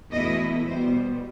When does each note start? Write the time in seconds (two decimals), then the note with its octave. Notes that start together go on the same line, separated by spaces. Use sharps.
0.11 E2 B2 A3 E4 D#5
0.67 B2 G3 B3 C5